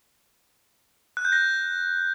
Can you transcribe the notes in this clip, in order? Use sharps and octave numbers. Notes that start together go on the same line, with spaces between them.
F#6
G6
A#6